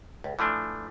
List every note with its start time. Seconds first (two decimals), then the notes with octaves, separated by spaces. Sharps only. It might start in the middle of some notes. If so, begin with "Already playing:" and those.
0.24 C#2
0.39 E3 F3 A3 D4